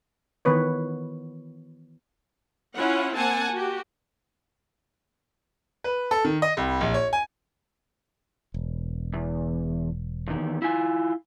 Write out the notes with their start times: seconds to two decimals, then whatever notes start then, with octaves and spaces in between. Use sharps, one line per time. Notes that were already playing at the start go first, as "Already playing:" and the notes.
0.45 D#3 E3 B3 B4 C#5
2.74 C#4 E4 F4 F#5
3.15 A#3 C4 F#5 G#5 A5
3.52 F#4 G4
5.84 B4
6.11 A4
6.25 D#3
6.42 D#5
6.57 C2
6.81 A#1
6.94 C#5
7.13 G#5
8.54 E1
9.13 E2
10.27 E2 D#3
10.62 E4 F4 G#5